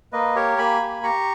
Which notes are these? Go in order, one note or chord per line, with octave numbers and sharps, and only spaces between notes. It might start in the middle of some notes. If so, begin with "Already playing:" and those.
A#3 B4 D#5
G4 A#4 C#5
A#3 G#5 B5
G4
G4 A#5 C#6